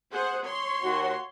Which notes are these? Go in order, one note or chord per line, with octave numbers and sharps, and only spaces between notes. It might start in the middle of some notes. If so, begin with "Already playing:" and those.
G#4 C5 F#5
C#5 C6
D#2 F#4